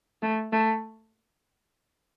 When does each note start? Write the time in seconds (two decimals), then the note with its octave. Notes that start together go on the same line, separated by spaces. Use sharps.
0.22 A3
0.52 A3